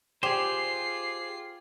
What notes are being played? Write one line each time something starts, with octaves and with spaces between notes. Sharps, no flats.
F4 G4 G#4 C5 C7